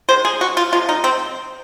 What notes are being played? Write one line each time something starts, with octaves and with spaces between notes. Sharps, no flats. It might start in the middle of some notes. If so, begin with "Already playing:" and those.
D#3 G#3 C5
G#4
F#4
F4
C3 F3 G#3 F4
D#4
C4